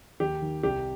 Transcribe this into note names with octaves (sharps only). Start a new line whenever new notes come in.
D#2 G4
D#3
C2 G4